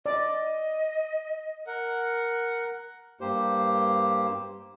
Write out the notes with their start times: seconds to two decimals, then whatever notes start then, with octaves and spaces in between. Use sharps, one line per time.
0.06 D5 D#5
1.67 A#4 F#5
3.21 G2 A#3 G4 C5